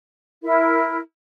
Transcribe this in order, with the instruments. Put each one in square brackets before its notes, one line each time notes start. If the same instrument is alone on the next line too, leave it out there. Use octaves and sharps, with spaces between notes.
[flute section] E4 A#4